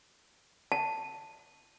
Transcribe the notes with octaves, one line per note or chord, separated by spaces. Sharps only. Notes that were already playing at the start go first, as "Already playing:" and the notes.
A5